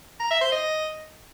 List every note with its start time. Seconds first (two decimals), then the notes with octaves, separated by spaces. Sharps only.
0.20 A#5
0.31 E5
0.41 C5
0.52 D#5